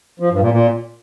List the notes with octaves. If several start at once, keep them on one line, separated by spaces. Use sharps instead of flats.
F3
G2
A#2
A#2